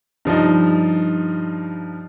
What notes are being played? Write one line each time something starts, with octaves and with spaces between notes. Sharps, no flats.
G2 F3 G3 D#4